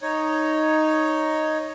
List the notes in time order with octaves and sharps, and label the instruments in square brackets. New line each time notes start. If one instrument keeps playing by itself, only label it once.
[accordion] D#4 C#5